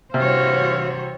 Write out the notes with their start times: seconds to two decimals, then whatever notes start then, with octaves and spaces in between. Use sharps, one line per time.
0.14 G2 C3 E3 F#4 C5 C#5 F5